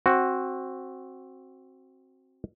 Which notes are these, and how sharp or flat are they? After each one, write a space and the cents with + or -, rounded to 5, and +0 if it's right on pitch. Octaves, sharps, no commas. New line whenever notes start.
C4 +15 F#4 +0